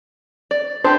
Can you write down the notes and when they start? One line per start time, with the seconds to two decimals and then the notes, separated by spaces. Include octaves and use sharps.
0.51 D5
0.85 D4 G4 B4 C5